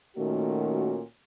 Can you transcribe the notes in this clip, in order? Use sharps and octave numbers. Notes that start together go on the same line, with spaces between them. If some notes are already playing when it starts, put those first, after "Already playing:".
A#2 D#3 A3 C#4 F#4